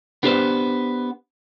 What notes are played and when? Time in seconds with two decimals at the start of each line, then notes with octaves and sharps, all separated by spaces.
0.23 B3 D4 G4 G#4 B4 C5